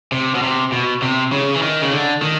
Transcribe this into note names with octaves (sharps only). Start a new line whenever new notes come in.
C3
B2
C3
B2
C3
C#3
E3
D#3
C#3
D3
D#3